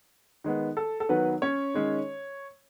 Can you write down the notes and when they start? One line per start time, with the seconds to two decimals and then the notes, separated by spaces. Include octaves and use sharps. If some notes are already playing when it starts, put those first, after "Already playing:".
0.44 D#3 G#3 B3
0.77 A4
1.00 A4
1.09 D#3 F#3 B3 B4
1.42 C#4 C#5
1.74 D#3 G#3 C#4